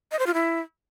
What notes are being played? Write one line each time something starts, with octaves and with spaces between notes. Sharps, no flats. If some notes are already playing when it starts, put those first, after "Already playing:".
D#5
C5
F4
E4